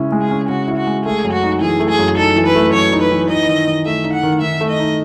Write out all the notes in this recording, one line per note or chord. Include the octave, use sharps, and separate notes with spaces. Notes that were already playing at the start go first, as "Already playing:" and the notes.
Already playing: C#3 G#3 C#4 E4
G#3
G#4
C#4
C#3 F#4
E4
F#4
G#3
A3 G#4
F#2
F#4
D#4
E3 G#4
A3
G#4
F#2
D#4 A4
E3
B4
A3
F#2 C#5
D#4
B4
E3
D#4 D#5
D#3
D#3
A3 E5
D#4
F#5
D#3
D#3 E5
A3
D#5
D#4